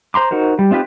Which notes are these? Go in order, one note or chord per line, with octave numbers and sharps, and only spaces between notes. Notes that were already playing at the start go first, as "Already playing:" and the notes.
C5 A#5 C6 D6
D#4 F#4 A#4 C5
G3
C4 D#4 F4 G4 B4